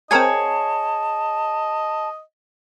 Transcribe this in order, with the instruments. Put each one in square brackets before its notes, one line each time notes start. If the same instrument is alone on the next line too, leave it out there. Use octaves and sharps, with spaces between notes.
[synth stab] C4 A#4 G#5 [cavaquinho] G#4 C#5 [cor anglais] D#5 [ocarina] A5